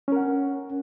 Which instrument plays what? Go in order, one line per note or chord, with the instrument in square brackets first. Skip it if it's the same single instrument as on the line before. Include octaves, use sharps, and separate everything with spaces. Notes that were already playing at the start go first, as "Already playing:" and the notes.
[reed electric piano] C#4
A#4
F#5